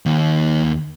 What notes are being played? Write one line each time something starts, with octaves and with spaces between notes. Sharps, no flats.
D#2 D#3